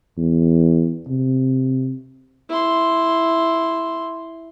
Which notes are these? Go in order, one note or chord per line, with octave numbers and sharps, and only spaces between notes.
E2
C3
E4 C6